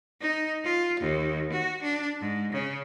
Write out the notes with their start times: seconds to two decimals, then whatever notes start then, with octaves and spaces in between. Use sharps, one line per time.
0.21 D#4
0.64 F4
1.00 D#2
1.52 F#4
1.83 D4
2.20 G#2
2.52 C#3